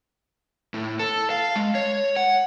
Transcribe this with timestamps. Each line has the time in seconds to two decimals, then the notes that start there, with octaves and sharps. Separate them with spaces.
0.74 A2
0.99 A4
1.30 F5
1.56 G#3
1.75 C#5
2.17 F#5